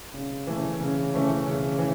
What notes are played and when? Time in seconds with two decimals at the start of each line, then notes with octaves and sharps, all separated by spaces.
0.14 C#3
0.47 E3 A3 C#4
0.80 C#3
1.13 E3 A3 C#4
1.47 C#3
1.79 E3